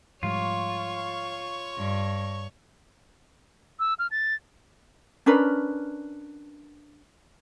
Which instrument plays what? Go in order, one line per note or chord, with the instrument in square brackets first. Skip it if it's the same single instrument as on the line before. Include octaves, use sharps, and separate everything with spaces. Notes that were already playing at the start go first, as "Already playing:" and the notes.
[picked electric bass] G#2 F3 G3 [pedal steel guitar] F4 [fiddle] C#5 C#6
[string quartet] G2
[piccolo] E6
F6
A6
[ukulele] C#4 D4 A#4 B4